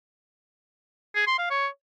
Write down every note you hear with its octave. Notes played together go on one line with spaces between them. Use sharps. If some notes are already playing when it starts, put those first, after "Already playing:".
G#4
C6
F5
C#5